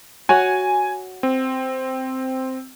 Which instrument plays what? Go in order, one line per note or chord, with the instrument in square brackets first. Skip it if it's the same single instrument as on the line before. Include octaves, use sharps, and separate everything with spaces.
[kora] F#4 C#5 F#5 [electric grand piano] G#5
[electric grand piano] C4